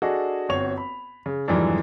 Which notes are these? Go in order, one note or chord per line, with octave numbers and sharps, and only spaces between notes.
D4 F#4 G#4 A4 D#5
G1 C4 F#4 C#5 C#6 F7
B5
C#3
F2 G#2 D3 E3 F#3 G3